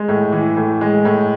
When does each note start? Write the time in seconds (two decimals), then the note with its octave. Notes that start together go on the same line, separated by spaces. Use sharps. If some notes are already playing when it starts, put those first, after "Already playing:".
Already playing: G#3
0.08 A2
0.32 E3
0.57 A2
0.81 G#3
1.05 A2